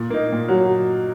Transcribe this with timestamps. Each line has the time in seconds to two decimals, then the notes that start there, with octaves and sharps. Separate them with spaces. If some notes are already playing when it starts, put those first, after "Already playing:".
Already playing: A#2
0.10 A#3 D#4
0.32 A#2
0.48 F#3